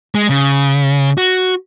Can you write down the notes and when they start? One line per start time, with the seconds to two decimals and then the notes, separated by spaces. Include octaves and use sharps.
0.15 G#3
0.30 C#3
1.18 F#4